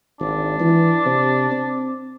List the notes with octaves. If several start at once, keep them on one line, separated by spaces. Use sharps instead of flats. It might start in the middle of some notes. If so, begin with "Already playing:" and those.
G#1 D4
E3
C3
C4